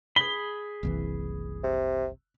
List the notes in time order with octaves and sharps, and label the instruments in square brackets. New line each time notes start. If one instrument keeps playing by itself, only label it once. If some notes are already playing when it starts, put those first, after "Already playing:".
[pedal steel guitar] G#4 B5 [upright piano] G7
[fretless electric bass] F#1 C2 E3
[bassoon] C3